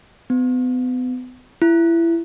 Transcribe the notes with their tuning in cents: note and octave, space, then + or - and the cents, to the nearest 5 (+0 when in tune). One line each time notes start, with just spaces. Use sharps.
B3 +35
E4 +20